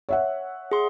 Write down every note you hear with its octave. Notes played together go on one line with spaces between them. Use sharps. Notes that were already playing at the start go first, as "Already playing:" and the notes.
C#5 E5 F#5
G#4 C6